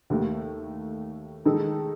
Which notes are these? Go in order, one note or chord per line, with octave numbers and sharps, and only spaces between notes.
D#2 D#3 A3
D#3 G#3 D#4 A4